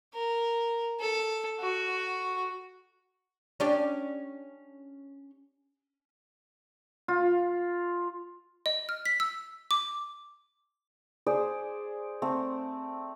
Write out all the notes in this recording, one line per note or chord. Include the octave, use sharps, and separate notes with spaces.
A#4
A4
F#4
C#4 D4 G4
F4
D#5
F6
B6
E6
D6
G#4 C5 D5
A3 C4